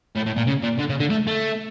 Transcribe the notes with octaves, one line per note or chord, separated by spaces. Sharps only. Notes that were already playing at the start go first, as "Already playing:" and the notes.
A2
A2
A#2
C#3
A#2
D3
C#3
D3
A3
A3